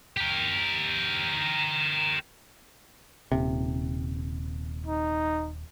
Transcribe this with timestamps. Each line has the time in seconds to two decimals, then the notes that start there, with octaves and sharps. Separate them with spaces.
0.17 G4 A#4
3.32 D#1 C3
4.87 D#4